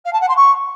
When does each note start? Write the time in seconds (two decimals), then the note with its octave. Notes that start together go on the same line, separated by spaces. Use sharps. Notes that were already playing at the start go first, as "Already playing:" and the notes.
0.05 F5
0.13 A5
0.21 F#5
0.28 C6
0.36 C#6